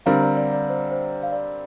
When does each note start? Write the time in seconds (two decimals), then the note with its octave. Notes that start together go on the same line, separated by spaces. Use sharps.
0.06 D3 G3 C4 A#4 F5 A#5
0.23 D5
0.37 D5
0.53 D5
0.69 C5
0.91 C5
1.23 F5
1.32 D5